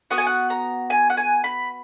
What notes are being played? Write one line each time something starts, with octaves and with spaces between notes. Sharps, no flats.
B3 F#4 F#5
G#5
F#5
A#5
G#5
F#5
G#5
B5